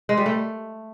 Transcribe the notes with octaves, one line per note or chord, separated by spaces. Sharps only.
G#3
G3
A3